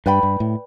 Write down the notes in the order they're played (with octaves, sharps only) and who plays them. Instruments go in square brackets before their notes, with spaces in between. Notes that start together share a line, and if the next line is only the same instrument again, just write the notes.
[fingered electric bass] G2 [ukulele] B4 D5 G5 B5
[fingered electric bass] G2
A2